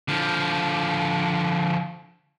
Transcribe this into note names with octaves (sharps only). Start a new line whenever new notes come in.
D3 F3